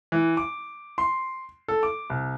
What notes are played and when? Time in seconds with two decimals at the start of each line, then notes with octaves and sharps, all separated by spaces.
0.12 E3
0.37 D6
0.98 C6
1.68 A4
1.83 D6
2.10 C2